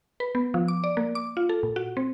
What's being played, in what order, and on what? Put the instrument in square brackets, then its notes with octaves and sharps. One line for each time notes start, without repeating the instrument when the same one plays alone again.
[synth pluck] B4
B3
F3
D6
D5
A#3
D6
F4
A4
A#2
F#4
C4